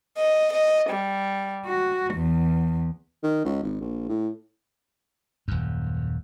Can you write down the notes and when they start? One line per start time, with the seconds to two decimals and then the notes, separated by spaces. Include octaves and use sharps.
0.18 D#5
0.54 D#5
0.90 G3
1.66 F#4
2.14 E2
3.23 D#3
3.45 C#2
3.63 G#1
3.80 A#1
4.09 A2
5.48 D#1 F#2